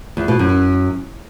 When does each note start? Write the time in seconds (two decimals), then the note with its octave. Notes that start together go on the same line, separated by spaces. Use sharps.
0.17 E2
0.28 B2
0.39 F#2